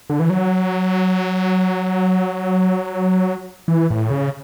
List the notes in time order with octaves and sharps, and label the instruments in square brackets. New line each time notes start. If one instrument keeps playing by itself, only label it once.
[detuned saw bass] D3
E3
F#3
E3
A2
C#3